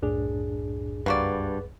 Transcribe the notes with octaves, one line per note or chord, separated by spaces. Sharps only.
C2 F#2 A2 D4 G#4
C#2 G2 A#3 F#4 B4 D5